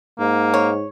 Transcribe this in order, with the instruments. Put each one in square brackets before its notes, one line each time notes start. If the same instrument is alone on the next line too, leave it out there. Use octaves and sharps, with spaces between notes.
[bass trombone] G#2 [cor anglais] A#3
[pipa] C#5